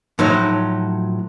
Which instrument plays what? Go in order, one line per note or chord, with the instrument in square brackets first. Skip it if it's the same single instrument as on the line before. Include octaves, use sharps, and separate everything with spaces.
[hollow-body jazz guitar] A2 F3 F#3 D#4